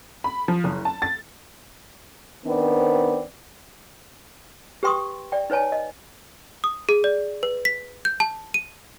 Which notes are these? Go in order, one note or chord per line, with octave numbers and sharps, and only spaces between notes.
B5
F3
F#1
A5
A6
D#3 B3 C4 D4 C5 D5
G4 B4 G5 C6 C#6 D#6
D5 G5
D#4 B4 C#5 G#5 A5
D#5
D#6
G#4
D5
B4
B6
G6
A5
D#7